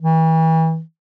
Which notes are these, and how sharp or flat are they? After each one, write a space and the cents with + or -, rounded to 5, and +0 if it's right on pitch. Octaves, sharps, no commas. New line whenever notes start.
E3 -35